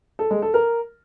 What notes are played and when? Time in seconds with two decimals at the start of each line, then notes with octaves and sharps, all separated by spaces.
0.19 A4
0.31 G#3
0.42 A4
0.54 A#4